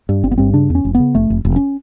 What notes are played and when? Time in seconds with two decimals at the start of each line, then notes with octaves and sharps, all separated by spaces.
0.09 G2
0.24 G1 C4
0.31 B3
0.38 G2 C4
0.53 C#3 D4
0.70 E2
0.75 C#4
0.85 F1
0.95 C#3 B3
1.15 F1 A3
1.30 F1
1.45 F1
1.56 C#4